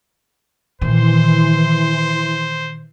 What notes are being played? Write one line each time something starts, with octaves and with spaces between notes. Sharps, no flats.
A#2 D#3 E3 C5 C6